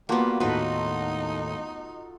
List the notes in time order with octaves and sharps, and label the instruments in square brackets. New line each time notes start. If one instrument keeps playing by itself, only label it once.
[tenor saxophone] G3 [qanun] A#3 B3 [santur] F4 F#4 A5
[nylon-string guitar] D#2 A2 [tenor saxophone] D#4 [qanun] F#4 B4 [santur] A4 C6